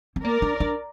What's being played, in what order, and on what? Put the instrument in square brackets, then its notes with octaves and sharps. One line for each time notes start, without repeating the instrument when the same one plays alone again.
[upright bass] C4
[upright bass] A#3 [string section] A#4 D5
[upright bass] D4
D4